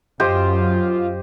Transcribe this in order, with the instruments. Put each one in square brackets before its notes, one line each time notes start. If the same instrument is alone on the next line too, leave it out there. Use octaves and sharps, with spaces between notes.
[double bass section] F#2 [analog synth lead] F4 [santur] G4 C5 D#5